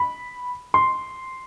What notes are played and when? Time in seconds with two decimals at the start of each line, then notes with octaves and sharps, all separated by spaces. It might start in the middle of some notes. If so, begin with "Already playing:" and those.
Already playing: B5
0.74 C6